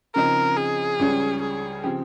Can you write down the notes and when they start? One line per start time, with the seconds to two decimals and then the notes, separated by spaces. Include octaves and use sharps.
0.15 C#3 F3 C4 D#4 A#4
0.57 G#4
0.99 C#2 C#3 G3 C#4
1.41 G#4
1.84 C#3 F3 C4 G4